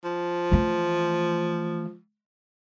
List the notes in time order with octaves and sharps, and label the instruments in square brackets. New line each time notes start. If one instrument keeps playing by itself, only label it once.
[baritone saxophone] F3
[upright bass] E3 A3